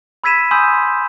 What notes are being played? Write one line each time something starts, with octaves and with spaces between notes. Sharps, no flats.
B5 E6 G#6 B6 D#7 E7
G#5 B5 C6 D#6 E6 G6